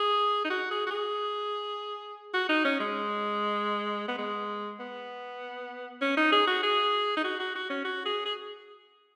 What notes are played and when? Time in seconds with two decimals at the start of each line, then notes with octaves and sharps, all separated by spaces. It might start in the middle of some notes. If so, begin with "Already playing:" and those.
Already playing: G#4
0.44 D#4
0.50 F#4
0.71 G#4
0.86 F#4
0.91 G#4
2.34 F#4
2.49 D#4
2.65 C#4
2.80 G#3
4.08 B3
4.18 G#3
4.79 B3
6.01 C#4
6.17 D#4
6.32 G#4
6.47 F#4
6.63 G#4
7.17 D#4
7.24 F#4
7.40 F#4
7.55 F#4
7.70 C#4
7.85 F#4
8.06 G#4
8.26 G#4